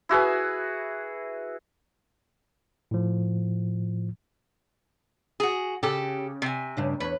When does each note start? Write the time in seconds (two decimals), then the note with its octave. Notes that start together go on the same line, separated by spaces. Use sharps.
0.09 E4 F#4 G#4 B4
2.91 A2 F3
5.40 F#4 G#4
5.83 C#3 G4 A4
6.42 C3 G#5
6.77 G2 C#3 D4
7.00 E2 B4 C#5